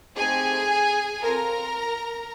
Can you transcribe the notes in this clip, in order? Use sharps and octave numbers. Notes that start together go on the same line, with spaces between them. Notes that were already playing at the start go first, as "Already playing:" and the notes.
A3 C4 D#4 G4 G#4 G#5
C4 F4 A4 A#4 A#5